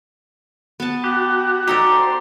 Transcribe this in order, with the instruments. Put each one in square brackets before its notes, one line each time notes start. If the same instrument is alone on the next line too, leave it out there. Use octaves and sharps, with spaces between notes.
[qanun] B3 A5
[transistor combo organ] F#4 [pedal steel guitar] G4
[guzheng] D#4 A4 [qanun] F#4 D5 [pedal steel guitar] G4
[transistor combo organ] C5